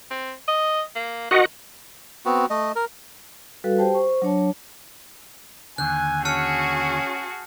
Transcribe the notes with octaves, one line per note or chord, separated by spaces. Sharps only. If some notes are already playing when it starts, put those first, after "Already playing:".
C4
D#5
A#3
D#3 F#4 D#5 F#5
B3 C4 F#4
A3 D#5
A#4
G3 F#4 A4 B4 F5
G4 C5 G5 A5
C5 C#6
F#3 D4 C#5 A5
D#2 D3 G#5 F#6 G6
C#4 F#4 G#4 A5 F6 C#7